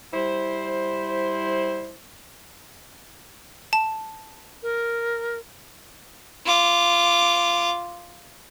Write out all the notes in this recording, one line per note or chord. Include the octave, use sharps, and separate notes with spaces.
G3 E4 C5
A5
A#4
F4 D6